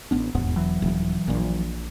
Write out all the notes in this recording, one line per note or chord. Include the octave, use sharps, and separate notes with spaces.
A1 B3 D4
E1 D#2 G#2 B3
E3 F#3
D#1
A#1 A#2